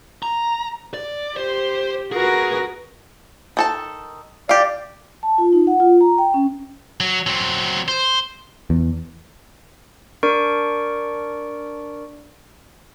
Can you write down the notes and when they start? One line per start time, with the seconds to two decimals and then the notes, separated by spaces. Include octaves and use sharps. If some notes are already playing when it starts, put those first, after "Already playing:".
0.23 A#5
0.94 D5
1.36 G4 C5
2.12 F#4 G#4 A#4 B4
3.57 D#3 A4 A5
4.49 G4 D5 F5
5.23 A5
5.38 F4
5.53 D#4
5.67 F#5
5.80 F4
6.01 A#5
6.18 G5
6.34 C#4
7.00 F#3
7.27 F#3 C4
7.88 C5
8.70 E2
10.23 D4 A#4 D5 C#6 D7